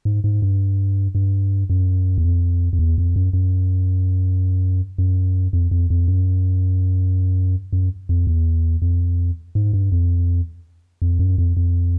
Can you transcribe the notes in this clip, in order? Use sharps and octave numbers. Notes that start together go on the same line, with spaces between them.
G#2
G#2
G2
G2
F#2
E2
F2
F2
E2
F2
F#2
F#2
F#2
F2
F2
F2
F#2
F#2
F2
E2
F2
G#2
G2
F2
F2
F#2
F2
F2